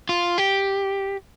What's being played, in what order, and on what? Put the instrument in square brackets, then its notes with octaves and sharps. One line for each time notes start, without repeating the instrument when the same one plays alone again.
[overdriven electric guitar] F4
G4